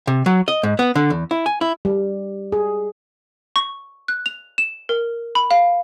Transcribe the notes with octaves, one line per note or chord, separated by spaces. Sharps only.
C3
F#3
D#5
G#2
B3
D3
E2
E4
G#5
E4
G3
G#4
C#6
F#6
F7
E7
A#4
B5
F5